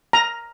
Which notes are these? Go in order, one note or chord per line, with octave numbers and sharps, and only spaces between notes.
A#5